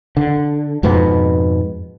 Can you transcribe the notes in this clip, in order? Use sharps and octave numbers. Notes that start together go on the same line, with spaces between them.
D3
F2 G#2 B2 B3